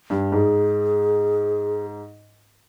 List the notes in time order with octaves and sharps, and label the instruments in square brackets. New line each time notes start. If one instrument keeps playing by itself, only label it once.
[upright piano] G2
[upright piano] G#2 [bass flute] G#4